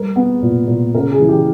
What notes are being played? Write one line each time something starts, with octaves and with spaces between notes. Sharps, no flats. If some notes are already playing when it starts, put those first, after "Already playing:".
Already playing: G3 A#4
B3
A#2
A#2
C#3 A#4
G#4
E3
G4